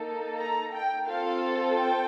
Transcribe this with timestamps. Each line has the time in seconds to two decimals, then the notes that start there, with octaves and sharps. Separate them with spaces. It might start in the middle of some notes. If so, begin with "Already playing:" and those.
Already playing: A#3 D#4 A4
0.38 A#5
0.72 G5
1.07 C4 F4 A4 F5
1.76 G5